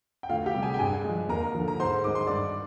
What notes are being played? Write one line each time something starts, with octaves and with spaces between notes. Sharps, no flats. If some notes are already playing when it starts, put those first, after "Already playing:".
G5
D2 F4 F5
G4 G5
C3 G3
G#4 G#5
G5
G2 G#4 G#5
F3 G#3
D#2 A#4 A#5
D3 F3
A#5
G#2 C5 C6
D#3 G#3 D6
C6
G2 D5 D6